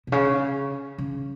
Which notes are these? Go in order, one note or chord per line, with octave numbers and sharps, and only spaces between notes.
B2
C#3
C#3